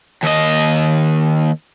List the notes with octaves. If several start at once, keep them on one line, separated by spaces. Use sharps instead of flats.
D#2 D#5